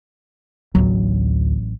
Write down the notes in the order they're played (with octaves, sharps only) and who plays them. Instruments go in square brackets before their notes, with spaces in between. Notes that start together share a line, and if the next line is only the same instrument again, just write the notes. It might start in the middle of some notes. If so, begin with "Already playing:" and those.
[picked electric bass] A1 F#3 [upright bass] D2